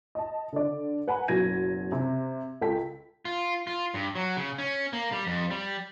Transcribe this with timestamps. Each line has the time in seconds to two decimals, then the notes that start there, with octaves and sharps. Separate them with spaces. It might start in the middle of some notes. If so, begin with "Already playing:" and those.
0.15 D#5 A5
0.53 D3 D5
1.07 B4 F#5 G#5 A#5 B5
1.28 F#1 B2 F#3 G#6 A#6 D#7
1.92 C3
2.61 C#2 A4 G5 B6
3.25 F4
3.67 F4
3.94 G2
4.15 F#3
4.37 C#3
4.58 C#4
4.93 A#3
5.12 G3
5.27 F2
5.51 G3